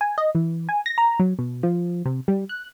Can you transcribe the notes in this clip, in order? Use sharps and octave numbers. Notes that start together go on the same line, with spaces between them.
G#5
D#5
E3
G#5
A#6
A#5
F#3
B2
F3
C3
G3
F#6